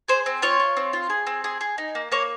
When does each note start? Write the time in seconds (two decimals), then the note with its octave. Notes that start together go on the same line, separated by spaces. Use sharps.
0.08 G#4 C5
0.26 C4
0.42 F4 C#5
0.60 F4
0.77 C4
0.93 F4
1.10 G#4
1.27 C4
1.44 G#4
1.61 G#4
1.78 D#4
1.95 A#3
2.12 A#3 C#5